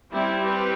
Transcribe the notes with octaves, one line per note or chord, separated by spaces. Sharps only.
G3 C4 E4
G4 B4